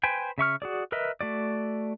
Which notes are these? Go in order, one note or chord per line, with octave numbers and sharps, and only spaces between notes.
B4 C5 G5 G#5
C#3 E5 C#6 F6
F#4 G#4 D5
A#4 B4 D#5 E5
A3 F#4 D5